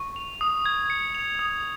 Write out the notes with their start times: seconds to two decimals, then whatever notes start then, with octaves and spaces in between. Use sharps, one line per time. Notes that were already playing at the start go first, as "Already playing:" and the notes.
Already playing: C#6
0.16 F7
0.41 D#6
0.66 G#6
0.90 C#7
1.15 F7
1.39 D#6